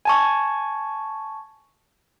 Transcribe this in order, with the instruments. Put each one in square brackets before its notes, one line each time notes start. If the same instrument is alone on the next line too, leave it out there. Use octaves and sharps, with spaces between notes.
[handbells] G#5 A5 C#6